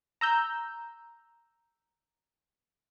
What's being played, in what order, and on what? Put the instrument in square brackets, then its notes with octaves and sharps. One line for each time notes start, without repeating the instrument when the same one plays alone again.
[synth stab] A#5 E6 G6